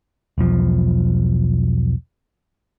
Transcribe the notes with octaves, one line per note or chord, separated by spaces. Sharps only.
E1 B1 F3